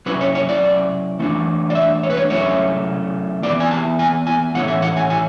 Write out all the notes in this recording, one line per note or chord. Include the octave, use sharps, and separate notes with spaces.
F#3 C#4 E4 B4
C#5
C#5
D5
E3 A3 D4
D5
E5
C#5
B4
C#5
F#3 A3 C#4 E4 C#5
E3 B3 E4 D5
G#5
A5
G#5
G#5
A2 E3 A3 C#4 E4 F#5
E5
F#5
G#5
G#5